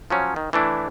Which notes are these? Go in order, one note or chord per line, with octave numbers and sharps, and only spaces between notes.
F3 F#3 C#4
D#3
E3 A3 D4 E4